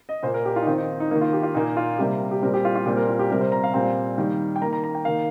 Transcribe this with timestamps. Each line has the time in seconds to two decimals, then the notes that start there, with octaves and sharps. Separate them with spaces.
0.09 D#5
0.23 A#2 A#3 C5
0.34 A#4
0.46 G4
0.56 F4
0.62 D#4
0.66 D#3 C4 F4
0.78 D#4
1.00 D#4
1.11 D#3 A#3 D#4
1.21 F4
1.33 G4
1.43 F4
1.55 A#2 A#3 D#4
1.77 F4
1.98 C3 G3 A#3 G4
2.31 G4
2.42 A#2 G3 C4 A#4
2.54 G4
2.65 F4
2.75 F4
2.86 A#2 G3 C4 G4
2.97 A#4
3.08 F4
3.19 G4
3.30 C3 G3 C4 A#4
3.41 C5
3.52 A#5
3.64 F5
3.74 A#2 G3 C4 F5
4.18 D#3 G3 A#3
4.56 G5
4.61 D#3 A#3 A#5
4.73 A#5
4.84 A#5
4.95 G5
5.05 D#3 A#3 F5